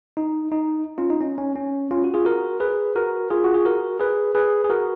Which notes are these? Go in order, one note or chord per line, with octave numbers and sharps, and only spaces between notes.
D#4
D#4
C#4 F4
D#4
C#4
C#4
C#4
C#4 F4
F#4
F4 G#4
F#4 A#4
G#4 B4
F#4 A#4
F4 G#4
F#4
G#4
F#4 A#4
G#4 B4
G#4 B4
G#4
F#4 A#4